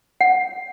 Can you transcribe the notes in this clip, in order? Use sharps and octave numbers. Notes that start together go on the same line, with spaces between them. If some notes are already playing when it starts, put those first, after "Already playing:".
F#5